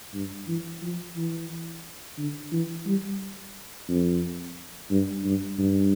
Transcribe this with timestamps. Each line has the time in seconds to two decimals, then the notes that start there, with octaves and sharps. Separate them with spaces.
0.14 G2
0.48 E3
0.82 F3
1.16 E3
2.18 D3
2.52 E3
2.86 G3
3.89 F2
4.91 G2
5.24 G2
5.58 G2